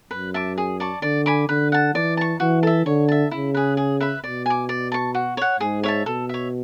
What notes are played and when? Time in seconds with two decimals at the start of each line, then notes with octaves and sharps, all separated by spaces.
0.11 F#2 B4
0.34 E5 A5 D6
0.58 G#4
0.80 D5 A5 C#6
1.02 D3 D5
1.26 G#5 B5 D6
1.48 D3 B4
1.72 F#5 A5
1.94 E3 D5
2.17 A5 C#6
2.40 E3 F#4
2.63 A4 E5
2.86 D3 C#5
3.08 E5 A5
3.31 C#3 E4
3.54 G#4 B4
3.77 G#4
4.00 B4 E5 B5
4.24 B2 D5
4.46 G#5 D6
4.69 D5
4.92 A5 C#6
5.15 F#4
5.37 C#5 F#5
5.60 G#2 G#4
5.83 C#5 E5 A5
6.06 B2 A4
6.29 C#5 E5